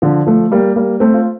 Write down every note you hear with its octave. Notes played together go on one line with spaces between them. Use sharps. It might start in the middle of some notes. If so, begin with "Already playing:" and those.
D3 F3
F3 A3
G3 A#3
G3 A#3
A3 C4
F4